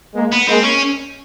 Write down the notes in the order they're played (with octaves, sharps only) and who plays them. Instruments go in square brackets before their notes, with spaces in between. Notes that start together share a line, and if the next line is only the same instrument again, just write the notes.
[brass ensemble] G#3 A#3
[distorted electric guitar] B3
[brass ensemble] G#3 A#3 [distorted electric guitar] C4
[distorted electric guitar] C#4